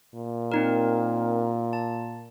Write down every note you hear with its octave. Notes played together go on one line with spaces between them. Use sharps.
A#2
C4 D#4 A#4
A5